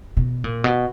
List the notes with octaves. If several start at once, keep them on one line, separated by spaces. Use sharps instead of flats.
B2
A#2
B2